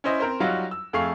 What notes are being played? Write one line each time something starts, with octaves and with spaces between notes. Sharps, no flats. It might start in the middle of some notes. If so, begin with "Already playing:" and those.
C#4 E4 C5 D#5
C4 A#4 C5
F#3 G3 D#4 F4 F#4
E6
F2 A3 G#4 F5 C#6 C7